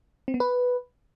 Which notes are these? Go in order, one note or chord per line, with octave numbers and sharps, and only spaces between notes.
C4
B3
B4